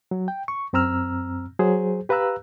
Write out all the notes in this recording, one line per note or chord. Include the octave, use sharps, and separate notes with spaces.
F#3
G5
C#6
F#2 C4 A#5 E6 F6
F#3 G#4 C5
G4 B4 F5 A#5 E6 F#6